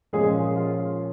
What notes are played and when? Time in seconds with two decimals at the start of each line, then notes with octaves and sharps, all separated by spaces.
0.13 A#2 F3 G#3 A#3 C#4 G#4
0.56 F4 F5